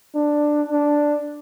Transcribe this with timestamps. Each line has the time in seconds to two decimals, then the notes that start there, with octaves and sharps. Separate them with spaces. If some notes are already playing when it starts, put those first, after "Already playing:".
0.15 D4
0.69 D4